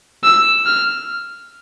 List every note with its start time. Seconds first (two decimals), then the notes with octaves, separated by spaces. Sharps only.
0.24 E6
0.66 F6